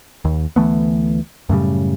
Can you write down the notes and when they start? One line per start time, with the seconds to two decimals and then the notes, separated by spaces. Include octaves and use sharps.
0.25 D#2
0.56 D2 E3 A3 B3
1.49 F#2 A2 C#3 G3